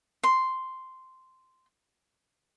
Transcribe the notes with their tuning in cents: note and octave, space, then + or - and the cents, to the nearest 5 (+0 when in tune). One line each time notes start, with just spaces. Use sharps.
C6 -5